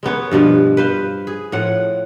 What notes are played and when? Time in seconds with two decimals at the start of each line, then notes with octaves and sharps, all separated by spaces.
0.03 G#3 A#3 B3 C#5
0.31 G2 B2 F3 B3
0.77 B4 C5 F5
1.27 G#4
1.52 A2 F3 F#5